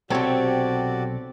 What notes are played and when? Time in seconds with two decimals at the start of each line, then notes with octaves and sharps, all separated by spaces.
0.10 B1 C3 C4 F#4 G4 A4 C#5 D5